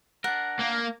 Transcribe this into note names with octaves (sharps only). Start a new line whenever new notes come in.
D4 A#4 F#5
A#3